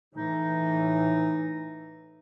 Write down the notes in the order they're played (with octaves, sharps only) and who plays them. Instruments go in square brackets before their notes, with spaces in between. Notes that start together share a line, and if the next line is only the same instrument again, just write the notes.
[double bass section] A2 E3 [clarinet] D#4